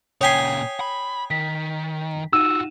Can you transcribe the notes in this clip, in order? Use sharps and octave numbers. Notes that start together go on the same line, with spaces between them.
A#2 C#3 C#5 G5 G#5 D#6 B6 C7
B5
D#3 B6
D#4 F4 F#4 E6 D#7 E7